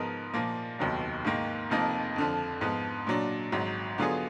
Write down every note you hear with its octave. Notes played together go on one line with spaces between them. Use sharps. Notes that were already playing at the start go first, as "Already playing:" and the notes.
Already playing: G#2 F3 B3 D#4 A#4
A#2 F3 A#3
F1 D#2 D#3 F#3 B3
G#2 D#3 A#3
F1 F2 F3 A#3 D#4
F2 D3 F3
G#2 F3 B3
A#2 F#3 D4
G#1 G#2 F#3
D3 F#3 B3 F4 G#4